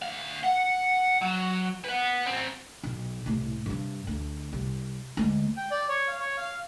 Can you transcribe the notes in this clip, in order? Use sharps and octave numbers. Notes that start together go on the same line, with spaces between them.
D2 F5
F#5
F#3
B4 F#5
G#2 C4
B1
C2 A2
G2 C3
D2
C2
D2 G#3
G5
D5
C#5
F5
C#5
F5